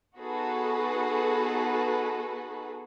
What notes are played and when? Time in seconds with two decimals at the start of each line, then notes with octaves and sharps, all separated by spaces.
0.17 B3 D#4 F#4 G#4 A4 B4